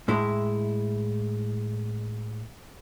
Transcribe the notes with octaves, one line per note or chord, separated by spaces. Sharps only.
A2 G#3 E4